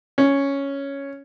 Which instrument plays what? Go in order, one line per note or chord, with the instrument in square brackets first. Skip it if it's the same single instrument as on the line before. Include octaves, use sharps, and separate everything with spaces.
[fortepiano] C#4